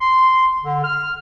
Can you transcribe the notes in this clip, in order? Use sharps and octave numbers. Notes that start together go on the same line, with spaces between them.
C6
D3
F6